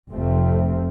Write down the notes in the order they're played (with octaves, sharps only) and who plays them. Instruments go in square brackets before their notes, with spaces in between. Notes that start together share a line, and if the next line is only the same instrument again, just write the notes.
[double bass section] F1 F2 C3 F3 A3 C4